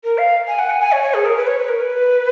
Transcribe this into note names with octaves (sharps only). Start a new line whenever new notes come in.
A#4
F5
G#5
F#5
G#5
G#5
C#5
C#5
G#4
A#4
B4
C#5
B4
A#4
B4